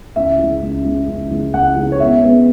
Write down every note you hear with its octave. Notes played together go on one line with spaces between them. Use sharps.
C#2 E5
C#3 G#3
C#2
C#3 G#3
C#2
C#3 G#3
C#2 F#5
C#3 G#3
C#5
B2 E5
G#3 B3